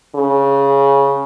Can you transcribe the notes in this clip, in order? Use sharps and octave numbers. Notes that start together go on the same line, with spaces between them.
C#3